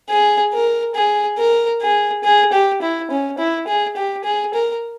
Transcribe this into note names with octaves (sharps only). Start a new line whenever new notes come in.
G#4
A#4
G#4
A#4
G#4
G#4
G4
E4
C#4
E4
G#4
G4
G#4
A#4